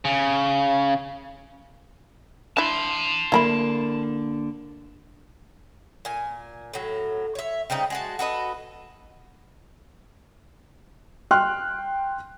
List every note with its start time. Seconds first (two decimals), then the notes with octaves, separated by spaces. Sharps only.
0.05 C#3
2.57 D4 E4 A5 C6
3.32 D3 A#3 E4 A#5 B5
6.05 A#2 G#5
6.73 A2 F#3
7.35 C#5 E5
7.70 C#3 G3 C4 D#4
7.90 G#3 F#4 A5
8.19 F#4 A4 B4 D#5
11.31 G5 C6 F6 F#6